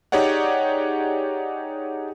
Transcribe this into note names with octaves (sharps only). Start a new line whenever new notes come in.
D#4 G4 G#4 C#5 D5 F#5